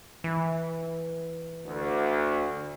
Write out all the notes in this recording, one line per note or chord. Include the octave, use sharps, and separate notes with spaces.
E3
D2